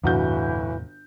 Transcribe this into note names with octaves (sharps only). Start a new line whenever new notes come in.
G1 E2 A2 C3 E3 F#4 G6